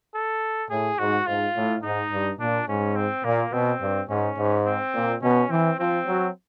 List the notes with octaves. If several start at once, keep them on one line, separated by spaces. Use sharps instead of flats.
A4
A2 G#4
G#2 F#4
G#2 F4
A2
G#2 D#4
G2
A#2 D4
G#2 C#4
C4
A#2 A#3
B2 C4
G2
G#2 C#4
G#2
C4
A#2
B2 C#4
E3 C4
F3 C4
F#3